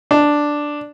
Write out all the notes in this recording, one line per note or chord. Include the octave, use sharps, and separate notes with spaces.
D4